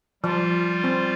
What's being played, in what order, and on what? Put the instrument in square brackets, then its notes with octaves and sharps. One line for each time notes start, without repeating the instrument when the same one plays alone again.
[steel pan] F3 [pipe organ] G3 F4
[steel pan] C4